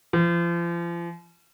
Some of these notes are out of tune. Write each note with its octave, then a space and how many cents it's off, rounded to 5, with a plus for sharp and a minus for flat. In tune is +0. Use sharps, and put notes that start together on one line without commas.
F3 -35